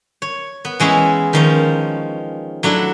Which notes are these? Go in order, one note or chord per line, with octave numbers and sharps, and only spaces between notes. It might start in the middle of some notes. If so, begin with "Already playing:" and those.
C#5
B3
E3 G#3 C#4 E4
D#3 F3 C#4
F#3 A3 D4 E4